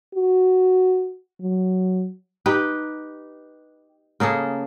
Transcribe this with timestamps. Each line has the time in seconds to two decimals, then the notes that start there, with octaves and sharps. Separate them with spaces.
0.15 F#4
1.40 F#3
2.46 D#4 G4 B4
4.20 C#3 A#3 G#4 A4